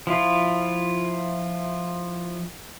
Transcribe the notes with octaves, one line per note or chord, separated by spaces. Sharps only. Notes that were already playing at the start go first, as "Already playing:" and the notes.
F3 E4 F4